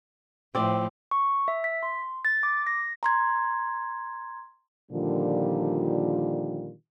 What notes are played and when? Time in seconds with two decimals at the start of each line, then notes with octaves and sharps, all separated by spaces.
0.55 A2 F3 C4 D5
1.11 C#6
1.48 E5
1.64 B6
1.83 C6
2.25 A6
2.43 D6
2.67 A#6
3.03 A#5 C6 G#6
4.92 A#2 D3 D#3 F3 G3 F4